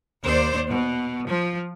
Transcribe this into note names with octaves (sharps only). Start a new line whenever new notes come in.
D#2 C5 D5
B2
F3